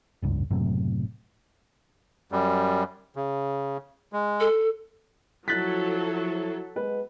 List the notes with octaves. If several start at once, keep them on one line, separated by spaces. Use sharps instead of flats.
F1 C#2 G2
F#1 F#2 A2 C3
F#2 G3
C#3
G#3
A4
F3 F#3 E4 A4 F#6 A6 B6
G#3 B3 B4